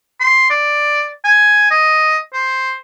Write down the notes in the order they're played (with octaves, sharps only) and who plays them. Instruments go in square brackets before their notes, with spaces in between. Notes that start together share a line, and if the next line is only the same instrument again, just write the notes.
[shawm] C6
D5
G#5
D#5
C5